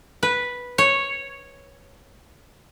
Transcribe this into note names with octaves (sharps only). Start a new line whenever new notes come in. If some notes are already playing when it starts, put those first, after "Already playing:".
B4
C#5